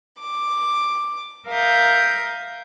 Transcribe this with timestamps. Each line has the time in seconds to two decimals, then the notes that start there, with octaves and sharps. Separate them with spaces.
0.18 D6
1.49 A#4 E5 F5 D#6 G6